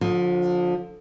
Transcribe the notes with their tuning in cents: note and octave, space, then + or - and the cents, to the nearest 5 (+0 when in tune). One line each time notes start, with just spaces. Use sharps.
D3 +0 F3 +30